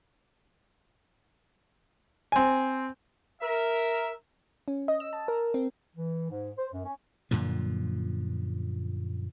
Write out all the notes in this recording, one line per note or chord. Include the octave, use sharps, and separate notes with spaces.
C4 G#5
A#4 E5
C#4
D#5
E6
A5
A#4
C4
E3
G#2
C5
F#2
C#4
F#2 A#2 D3 F3